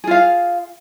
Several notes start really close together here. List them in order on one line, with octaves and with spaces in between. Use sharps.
G#4 F4 F5